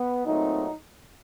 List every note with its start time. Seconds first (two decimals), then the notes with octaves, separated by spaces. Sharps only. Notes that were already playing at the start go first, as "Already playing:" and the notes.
Already playing: B3
0.24 A#2 F#3 A3 C4 D#4